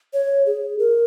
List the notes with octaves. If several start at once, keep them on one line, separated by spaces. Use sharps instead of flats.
C#5
G#4
A#4